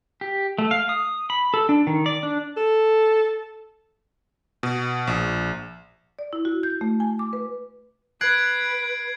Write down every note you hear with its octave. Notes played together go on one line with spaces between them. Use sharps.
G4
A3
F5
D#6
B5
A4
D4
D#3
D5
D4
A4
B2
A#1
D5
E4
F#4
G6
A3
G#5
D6
B4
B4 F#6 G#6 C7 D7